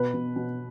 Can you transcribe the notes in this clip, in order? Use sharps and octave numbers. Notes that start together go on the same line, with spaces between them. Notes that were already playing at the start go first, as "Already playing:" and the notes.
Already playing: B2 B4
B2
B2